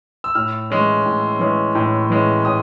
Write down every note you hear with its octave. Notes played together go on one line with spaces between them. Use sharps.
E6
A2 F6
E3 G#3 C#4
A2
E3 G#3 C#4
A2
E3 G#3 C#4
A2 D#6